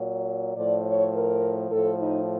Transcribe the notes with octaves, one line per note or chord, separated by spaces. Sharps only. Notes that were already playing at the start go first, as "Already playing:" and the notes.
Already playing: A#2 F#3
A2 F3 D5
C#5
A#4
A2 F3 A4
D#4